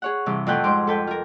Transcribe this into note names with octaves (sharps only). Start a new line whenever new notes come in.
G#4 C#5 F#5
G2 C3 E3
F2 A2 A4 B4 F#5 G5
G#2 D#4 C5 C6 D6
A4 B4 G5
F4 A#4